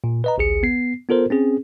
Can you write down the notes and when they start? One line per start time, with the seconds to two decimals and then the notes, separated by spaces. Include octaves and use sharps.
0.04 A#2
0.24 B4 D#5 A#5
0.38 A1 D2 G#4 C#7
0.63 B3 C7
1.09 B3 F4 A4 A#4 C5
1.30 C4 C#4 G#4